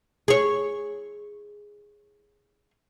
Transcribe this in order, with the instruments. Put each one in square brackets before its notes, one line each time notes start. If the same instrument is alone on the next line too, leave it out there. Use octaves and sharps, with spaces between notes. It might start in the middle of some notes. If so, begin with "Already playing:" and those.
[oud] G#4 C#5